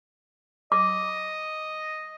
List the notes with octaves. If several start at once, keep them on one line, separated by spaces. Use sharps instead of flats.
D#5 D6